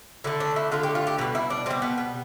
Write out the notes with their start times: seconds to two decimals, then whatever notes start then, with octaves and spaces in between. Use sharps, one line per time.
0.24 D3 A3 E4
0.40 D4
0.56 E4
0.72 D3 A3 F4
0.83 G4
0.95 F4
1.07 G4
1.18 B2 G3 B4
1.35 E4
1.50 D4
1.66 B2 G3 C4
1.82 B3
1.98 B3